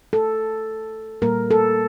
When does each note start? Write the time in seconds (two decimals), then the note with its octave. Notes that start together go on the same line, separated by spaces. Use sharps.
0.13 A4
1.22 A#2 G3 A#3 A#4
1.51 A4